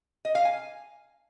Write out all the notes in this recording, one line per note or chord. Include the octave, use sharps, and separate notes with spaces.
D#5
F5
G#5